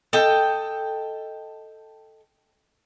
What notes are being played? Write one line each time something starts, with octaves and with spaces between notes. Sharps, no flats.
A4 D#5 G5